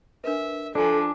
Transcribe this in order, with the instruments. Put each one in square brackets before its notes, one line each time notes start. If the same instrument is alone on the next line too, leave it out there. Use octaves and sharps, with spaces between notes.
[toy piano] D4 A#4 B4 [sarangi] E5
[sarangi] F3 [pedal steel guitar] D4 [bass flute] A4 [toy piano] D5 G#5 A#5